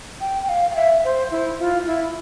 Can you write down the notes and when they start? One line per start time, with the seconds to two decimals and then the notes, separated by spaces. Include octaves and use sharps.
0.21 G5
0.43 G5
0.49 F5
0.70 F5
0.76 E5
1.04 C5
1.31 E4
1.59 F4
1.87 E4